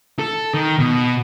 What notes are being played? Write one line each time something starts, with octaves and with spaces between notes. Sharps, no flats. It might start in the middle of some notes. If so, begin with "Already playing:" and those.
A4
D#3
B2